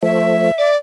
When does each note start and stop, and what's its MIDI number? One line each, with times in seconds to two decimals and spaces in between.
0.03 0.51 53
0.03 0.51 57
0.03 0.71 76
0.58 0.76 74
0.58 0.75 86